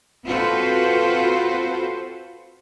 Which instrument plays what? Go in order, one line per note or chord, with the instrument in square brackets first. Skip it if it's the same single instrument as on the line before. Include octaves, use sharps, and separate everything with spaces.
[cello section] C4 F4 F#4 A4 B4 C5